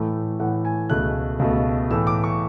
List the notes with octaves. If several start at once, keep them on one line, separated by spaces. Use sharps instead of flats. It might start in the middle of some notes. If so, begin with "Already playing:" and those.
Already playing: A2 E3 A3
A2 E3 A3 F#5
G#5
C#2 B2 A3 F#6
C#2 B2 A3
A2 E3 A3 E6
D6
C#6